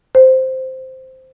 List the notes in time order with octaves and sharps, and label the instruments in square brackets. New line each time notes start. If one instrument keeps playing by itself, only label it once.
[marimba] C5